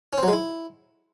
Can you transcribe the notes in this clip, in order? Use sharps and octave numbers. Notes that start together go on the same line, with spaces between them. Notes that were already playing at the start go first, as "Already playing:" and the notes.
C#4
C4
F#3
G#3
E4